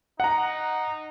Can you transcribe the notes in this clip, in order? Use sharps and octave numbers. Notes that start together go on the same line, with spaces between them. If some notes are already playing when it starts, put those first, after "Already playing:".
D#4 F#5 A#5